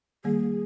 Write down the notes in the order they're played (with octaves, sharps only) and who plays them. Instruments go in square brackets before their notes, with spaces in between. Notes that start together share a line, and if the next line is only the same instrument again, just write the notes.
[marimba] D#3 G3 A#3 [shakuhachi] G#4